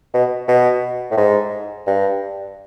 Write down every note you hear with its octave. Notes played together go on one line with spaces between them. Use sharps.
B2
B2
A2
G#2
G2